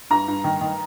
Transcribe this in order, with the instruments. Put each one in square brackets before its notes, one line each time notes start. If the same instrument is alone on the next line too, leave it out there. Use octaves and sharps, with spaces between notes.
[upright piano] G2 A#5
G2
D#3
D#3